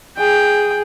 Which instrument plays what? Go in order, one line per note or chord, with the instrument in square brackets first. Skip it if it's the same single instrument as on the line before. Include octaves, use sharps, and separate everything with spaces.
[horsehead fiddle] G#4 [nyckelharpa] G5